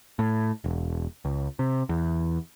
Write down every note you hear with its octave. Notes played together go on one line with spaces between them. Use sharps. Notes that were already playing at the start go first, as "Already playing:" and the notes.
A2
E1
C#2
C3
E2